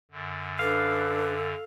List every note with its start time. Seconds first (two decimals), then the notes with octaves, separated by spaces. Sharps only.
0.11 F#2 D3
0.59 D4 A4 B4 F5 D6